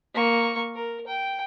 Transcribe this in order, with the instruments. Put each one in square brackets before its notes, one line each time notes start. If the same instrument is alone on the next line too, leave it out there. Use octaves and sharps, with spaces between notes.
[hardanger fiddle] A#3 C#6
A#4
G5